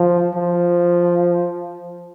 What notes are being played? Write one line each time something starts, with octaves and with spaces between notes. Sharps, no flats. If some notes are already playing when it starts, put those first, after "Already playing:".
Already playing: F3
F3